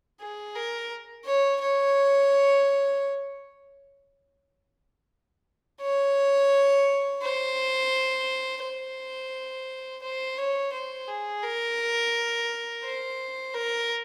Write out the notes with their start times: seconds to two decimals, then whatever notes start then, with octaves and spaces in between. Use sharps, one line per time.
0.21 G#4
0.55 A#4
1.25 C#5
1.61 C#5
5.81 C#5
7.22 C5
8.63 C5
10.03 C5
10.38 C#5
10.73 C5
11.08 G#4
11.44 A#4
12.84 C5
13.54 A#4